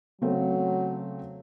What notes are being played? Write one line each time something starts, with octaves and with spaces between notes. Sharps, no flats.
C#3 F#3 A3 C4